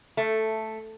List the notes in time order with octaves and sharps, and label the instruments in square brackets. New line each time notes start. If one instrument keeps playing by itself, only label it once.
[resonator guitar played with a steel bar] A3